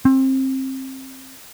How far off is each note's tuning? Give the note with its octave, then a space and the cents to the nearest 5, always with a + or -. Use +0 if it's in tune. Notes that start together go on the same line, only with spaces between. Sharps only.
C4 +25